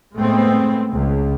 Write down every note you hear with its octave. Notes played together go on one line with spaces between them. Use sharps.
A2 G#3 A3 B3 C4
C#2